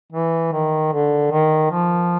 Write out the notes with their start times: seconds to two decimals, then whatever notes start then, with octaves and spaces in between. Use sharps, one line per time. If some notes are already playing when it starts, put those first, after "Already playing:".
0.12 E3
0.53 D#3
0.92 D3
1.31 D#3
1.71 F3